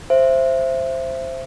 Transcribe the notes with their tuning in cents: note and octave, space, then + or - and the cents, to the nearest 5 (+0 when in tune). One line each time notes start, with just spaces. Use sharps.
C5 +5 E5 +20